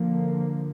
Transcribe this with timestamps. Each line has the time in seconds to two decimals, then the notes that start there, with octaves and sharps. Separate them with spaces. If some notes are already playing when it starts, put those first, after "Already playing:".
Already playing: D3 F3 A#3